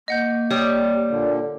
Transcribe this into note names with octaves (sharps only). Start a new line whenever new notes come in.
A#3 D#5 F#5 G6
G3 G4 C#5 D5 D#6
A#2 D3